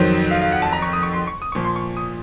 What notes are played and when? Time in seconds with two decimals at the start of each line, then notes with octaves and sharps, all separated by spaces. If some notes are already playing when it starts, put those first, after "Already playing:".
Already playing: F2 D#3 F#3 C5
0.31 F5
0.41 F5
0.52 F#5
0.62 A5
0.72 A#5
0.82 C#6
0.93 D#6
1.03 C#6
1.13 C6
1.27 C#6
1.42 D#6
1.52 A#2 F3 C#6
1.65 C6
1.76 C#6
1.97 D#6